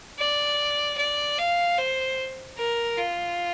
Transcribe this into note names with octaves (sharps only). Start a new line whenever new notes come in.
D5
D5
F5
C5
A#4
F4